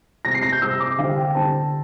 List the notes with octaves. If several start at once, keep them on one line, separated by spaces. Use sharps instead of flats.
C3 G3 C4 A#6
C7
A#6
G6
C3 G3 C4 E6
D6
D3 G3 D4 G4 C5 F5
G5
D3 G3 D4 G4 C5 A5